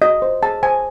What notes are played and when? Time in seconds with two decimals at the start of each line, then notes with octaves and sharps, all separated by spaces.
0.02 F#4 D#5
0.22 C5
0.43 G#4 A5
0.63 C5 G#5